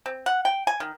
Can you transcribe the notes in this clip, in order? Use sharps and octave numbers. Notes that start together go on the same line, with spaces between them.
C4
F#5
G5
G#5
D#3